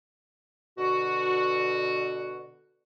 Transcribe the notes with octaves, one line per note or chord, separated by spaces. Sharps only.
B2 D3 F#4